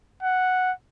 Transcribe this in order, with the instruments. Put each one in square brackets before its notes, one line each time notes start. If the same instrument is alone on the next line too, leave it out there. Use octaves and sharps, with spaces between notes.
[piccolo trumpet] F#5